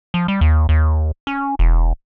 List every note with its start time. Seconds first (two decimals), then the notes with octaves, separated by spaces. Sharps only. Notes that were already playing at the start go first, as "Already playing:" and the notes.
0.14 F3
0.28 G3
0.41 D#2
0.69 D#2
1.27 C#4
1.59 E1